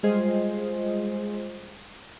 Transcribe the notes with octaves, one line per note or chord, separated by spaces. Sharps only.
G3 G#3 F4 G#4 C5 D#5